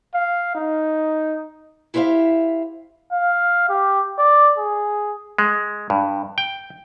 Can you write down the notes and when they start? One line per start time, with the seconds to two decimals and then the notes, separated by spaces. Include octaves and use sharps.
0.14 F5
0.55 D#4
1.94 E4 G4 C5 E5 F5
3.12 F5
3.69 G4
4.19 D5
4.58 G#4
5.38 G#3
5.90 G2
6.38 G5